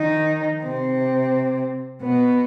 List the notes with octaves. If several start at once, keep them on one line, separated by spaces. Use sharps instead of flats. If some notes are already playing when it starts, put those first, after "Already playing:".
Already playing: D#3 D#4
C3 C4
B2 B3